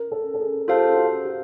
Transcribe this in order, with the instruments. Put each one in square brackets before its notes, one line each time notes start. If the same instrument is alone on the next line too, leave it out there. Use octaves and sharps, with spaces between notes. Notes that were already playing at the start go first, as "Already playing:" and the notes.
Already playing: [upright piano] A#4
A4
A4
G#4
[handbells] F4 A4 C5 F5 A5 [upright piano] G4
[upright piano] F#4
G4